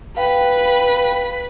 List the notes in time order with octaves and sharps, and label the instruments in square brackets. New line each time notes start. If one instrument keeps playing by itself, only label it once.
[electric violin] B4 B6 [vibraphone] F5 G5